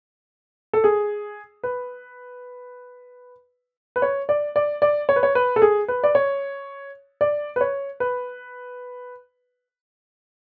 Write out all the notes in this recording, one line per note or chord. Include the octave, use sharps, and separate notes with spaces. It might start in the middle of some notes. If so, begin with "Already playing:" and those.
A4
G#4
B4
B4
C#5
D5
D5
D5
C#5
B4
C#5
B4
A4
G#4
B4
D5
C#5
D5
B4
C#5
B4